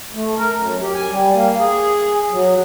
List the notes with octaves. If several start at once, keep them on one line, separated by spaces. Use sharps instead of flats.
A3
A#4
F#2
G4
G#5
G3
A#3
G#4
F#3